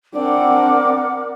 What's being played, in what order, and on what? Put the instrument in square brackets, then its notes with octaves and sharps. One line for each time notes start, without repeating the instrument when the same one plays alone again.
[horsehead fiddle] C4 [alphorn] D4 [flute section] A#4 F#5 D6 [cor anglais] D5